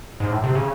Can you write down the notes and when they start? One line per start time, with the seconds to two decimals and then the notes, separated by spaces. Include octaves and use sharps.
0.20 G#2
0.31 A2
0.44 C3
0.55 C#3